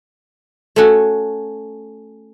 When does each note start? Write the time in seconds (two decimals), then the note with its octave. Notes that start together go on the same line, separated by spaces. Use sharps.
0.76 A3 C#4 F#4